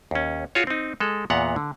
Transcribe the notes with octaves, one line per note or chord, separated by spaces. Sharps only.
D#2 C#4
F4 F#4 G#4 C#5
C4 D#4
G#3 A4
E2 A#2 B3 F#5 A#5
D3